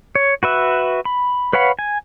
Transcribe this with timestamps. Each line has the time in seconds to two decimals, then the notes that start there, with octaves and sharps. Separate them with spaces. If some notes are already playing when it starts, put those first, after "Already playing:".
0.15 C#5
0.43 F#4 B4 E5
1.05 B5
1.53 B4 C#5 F5 F#5 B5
1.79 G#5